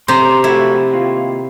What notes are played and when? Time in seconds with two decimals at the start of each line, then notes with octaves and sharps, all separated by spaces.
0.08 C3 C5 A#5 C6
0.44 F2 A3 E4 F#4
0.92 D#2 F4